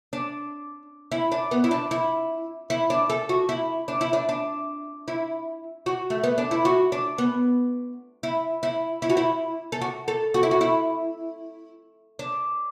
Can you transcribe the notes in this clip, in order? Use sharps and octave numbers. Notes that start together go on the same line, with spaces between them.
D4
E4
D4
B3
E4
D4
E4
E4
D4
A4
F#4
E4
D4
E4
D4
D4
E4
F#4
A3
B3
D4
E4
F#4
D4
B3
E4
E4
E4
F#4
E4
A4
F#4
A4
F#4
E4
F#4
E4
D4